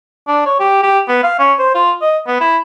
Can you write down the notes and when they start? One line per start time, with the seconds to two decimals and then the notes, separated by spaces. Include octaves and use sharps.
0.28 D4
0.46 C#5
0.60 G4
0.83 G4
1.08 B3
1.24 F5
1.39 C#4
1.59 C5
1.75 F4
2.02 D#5
2.27 B3
2.41 E4